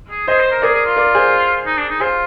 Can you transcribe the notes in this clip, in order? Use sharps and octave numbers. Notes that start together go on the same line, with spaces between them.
G#4
G#4 C5 D#5
C5
A#4
G#4 A#4 D5
G#4
F4
A#4 D5
G#4 C5
D#4
D4
D#4
F4 G#4 C5